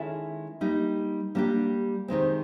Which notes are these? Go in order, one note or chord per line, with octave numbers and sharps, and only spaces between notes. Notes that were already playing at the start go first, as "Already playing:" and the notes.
Already playing: D#3 G#3 C#4 E4 A4
G3 A#3 D#4
G3 A#3 D4 G4
C3 D#3 G#3 C4